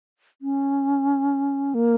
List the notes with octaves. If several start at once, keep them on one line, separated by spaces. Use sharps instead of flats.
C#4
A#3